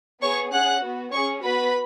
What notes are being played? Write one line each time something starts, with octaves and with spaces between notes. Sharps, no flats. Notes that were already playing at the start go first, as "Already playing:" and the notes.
B3 G#4 C#5 C#6
C#4 G#4 F#5 F#6
B3 F#4
C#4 G#4 C#5 C#6
B3 F#4 B4 B5